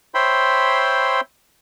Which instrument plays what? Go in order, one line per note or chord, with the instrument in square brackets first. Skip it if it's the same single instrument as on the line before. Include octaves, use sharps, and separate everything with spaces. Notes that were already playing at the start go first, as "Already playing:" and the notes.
[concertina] C5 C#5 E5 G5 B5 C6